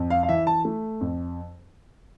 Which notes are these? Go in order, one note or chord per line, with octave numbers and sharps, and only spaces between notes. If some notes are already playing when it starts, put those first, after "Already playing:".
Already playing: F2
F5
F5
E3 E5
A5
A3
F2